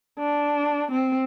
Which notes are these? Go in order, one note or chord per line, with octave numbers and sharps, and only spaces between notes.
D4
C4